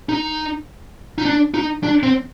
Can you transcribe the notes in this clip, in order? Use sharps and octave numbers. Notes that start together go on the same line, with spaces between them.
D#4
D#4
D4
D#4
D4
C4